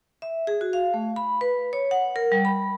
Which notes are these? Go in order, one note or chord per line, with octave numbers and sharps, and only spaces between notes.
E5
G#4
F#4
F5
A3
B5
B4
C#5
F#5
A#4
G3
B5